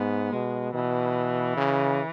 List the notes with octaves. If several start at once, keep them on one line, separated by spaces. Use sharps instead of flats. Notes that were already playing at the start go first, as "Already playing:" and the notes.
Already playing: G#2 B3
B2 G#3
B2 E3
C#3